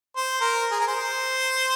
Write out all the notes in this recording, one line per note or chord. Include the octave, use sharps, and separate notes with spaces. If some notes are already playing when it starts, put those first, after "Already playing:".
C5
A#4
G#4
A#4
C5